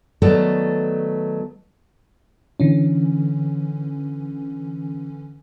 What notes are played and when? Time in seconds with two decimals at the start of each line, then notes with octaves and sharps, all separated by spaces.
0.22 D#3 F#3 A3 B3 A4 D5
2.60 D3 E3 C#4